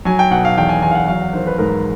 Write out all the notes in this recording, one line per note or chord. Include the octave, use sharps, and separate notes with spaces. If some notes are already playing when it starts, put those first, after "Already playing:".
F#3 G#5
G5
B2 F#5
F5
E2 G5
G#5
E2 G#5
F5
F#5
F#3 F5
F#5
D#3 C5
B4
G#2 A#4